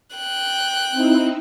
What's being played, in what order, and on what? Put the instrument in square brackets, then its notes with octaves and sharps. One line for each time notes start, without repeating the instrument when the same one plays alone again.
[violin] G5 F#6
[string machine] C4 D#4 E4